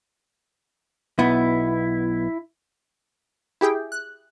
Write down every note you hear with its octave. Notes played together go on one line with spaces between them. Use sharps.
B1 B3 E4
E4 G4 G#4 G5
F#6